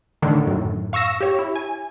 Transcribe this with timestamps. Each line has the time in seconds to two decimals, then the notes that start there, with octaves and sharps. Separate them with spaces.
0.22 A2 D3 D#3
0.47 F#2 A2
0.93 F5 C#6 E6 A#6 E7
1.21 G4 C#5
1.39 E4
1.56 G#5